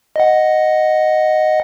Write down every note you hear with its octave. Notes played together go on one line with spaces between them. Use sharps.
D#5 F#5